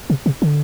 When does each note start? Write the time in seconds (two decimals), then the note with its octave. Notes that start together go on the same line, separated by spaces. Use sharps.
0.10 C3
0.26 C3
0.42 D3